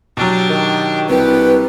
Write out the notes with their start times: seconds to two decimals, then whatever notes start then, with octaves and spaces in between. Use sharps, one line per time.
0.17 B2 F#3 D4 G4
0.50 D#3
1.10 C2 G4 B4